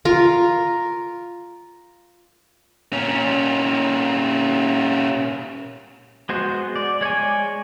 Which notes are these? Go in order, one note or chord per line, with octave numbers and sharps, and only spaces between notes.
F4 A#4
A#2 C#4
G#3 B3 F#4 C5
D5
G#3 C#5 D5 G#5